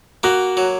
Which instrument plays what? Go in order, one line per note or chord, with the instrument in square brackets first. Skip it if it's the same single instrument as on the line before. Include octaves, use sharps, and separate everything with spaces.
[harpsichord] A#3 [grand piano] F#4
[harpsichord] F#3